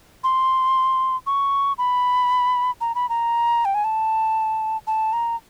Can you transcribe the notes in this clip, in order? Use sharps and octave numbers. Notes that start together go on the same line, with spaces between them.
C6
C#6
B5
A#5
B5
A#5
G5
G#5
A5
A5
A#5